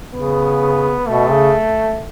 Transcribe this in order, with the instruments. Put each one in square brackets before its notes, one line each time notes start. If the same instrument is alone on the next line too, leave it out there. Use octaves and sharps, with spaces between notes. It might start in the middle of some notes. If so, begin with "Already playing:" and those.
[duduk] C#3 [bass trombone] B3
[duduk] B2 [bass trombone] A3
[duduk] C#3